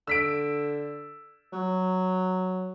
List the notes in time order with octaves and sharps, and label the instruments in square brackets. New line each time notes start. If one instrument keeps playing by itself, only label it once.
[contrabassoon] D3 [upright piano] E6 B6 D7
[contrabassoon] F#3